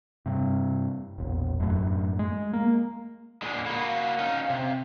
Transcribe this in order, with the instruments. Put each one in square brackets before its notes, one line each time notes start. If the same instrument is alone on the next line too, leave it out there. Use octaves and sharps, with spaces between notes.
[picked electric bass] G2 C3
E1 A#1
F#2 A2
G#3
A#3
[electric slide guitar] A#2 D3 G#3
[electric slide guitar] A#3 F#4 [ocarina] B5
[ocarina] F5
[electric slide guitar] C#4 D#4
C3